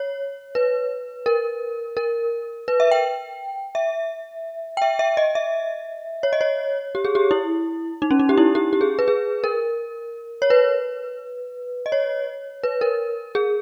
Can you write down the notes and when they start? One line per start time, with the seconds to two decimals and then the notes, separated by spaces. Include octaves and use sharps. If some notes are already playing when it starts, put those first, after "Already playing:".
Already playing: C#5
0.55 B4
1.26 A#4
1.97 A#4
2.68 B4
2.80 E5
2.91 G5
3.75 E5
4.77 G5
4.82 E5
4.99 E5
5.17 D#5
5.35 E5
6.23 C#5
6.33 D#5
6.41 C#5
6.95 G4
7.05 G#4
7.15 G4
7.31 E4
8.02 D#4
8.11 C#4
8.20 D#4
8.29 G4
8.37 E4
8.55 G4
8.73 G4
8.81 G#4
8.99 B4
9.08 G#4
9.44 A#4
10.42 C#5
10.50 B4
11.86 D#5
11.92 C#5
12.63 B4
12.81 A#4
13.35 G#4